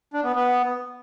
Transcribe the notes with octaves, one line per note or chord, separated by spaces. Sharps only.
D4
B3
B3